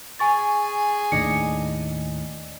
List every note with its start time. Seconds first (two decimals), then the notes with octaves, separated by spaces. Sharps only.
0.19 G#4 G#5 C#6 A6
1.12 D#2 A2 D#3 D4 D#5 G#5 C#7